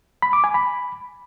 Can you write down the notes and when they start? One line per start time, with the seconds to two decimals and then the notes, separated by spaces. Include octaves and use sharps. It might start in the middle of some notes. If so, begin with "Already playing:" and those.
0.22 B5
0.33 D6
0.44 G#5
0.54 B5